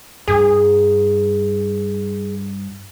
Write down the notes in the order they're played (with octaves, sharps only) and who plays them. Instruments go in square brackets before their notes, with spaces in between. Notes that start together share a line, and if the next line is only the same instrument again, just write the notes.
[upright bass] G2 [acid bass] G#4